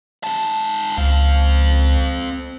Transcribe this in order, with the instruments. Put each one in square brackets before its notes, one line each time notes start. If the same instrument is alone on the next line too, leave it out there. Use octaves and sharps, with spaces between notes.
[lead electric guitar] G#2 A5
[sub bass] C#2 [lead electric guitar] C4 F5